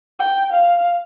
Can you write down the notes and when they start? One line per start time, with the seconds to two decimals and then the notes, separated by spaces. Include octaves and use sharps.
0.19 G5
0.52 F5